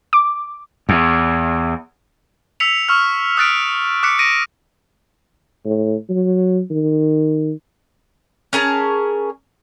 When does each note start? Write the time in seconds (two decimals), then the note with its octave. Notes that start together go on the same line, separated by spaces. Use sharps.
0.13 D6
0.89 E2
2.60 E6 B6 C#7 F7
2.89 C#6 E6 F6
3.37 D#6 F6 F#6 A6 B6 D7
4.03 D6 F#6 B6 C#7
4.19 A#6 D7 D#7
5.65 A2
6.09 F#3
6.71 D#3
8.53 C#4 G#4 A#4 A5